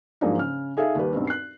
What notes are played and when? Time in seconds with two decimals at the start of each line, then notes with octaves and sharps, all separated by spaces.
0.21 G#2 F3 F#3 A#3 D4 D#4
0.37 C#3 F6
0.77 D#4 G#4 A4 E5 F5
0.95 D#2 G3 B4
1.12 B1 G2 C4
1.27 F#6 C7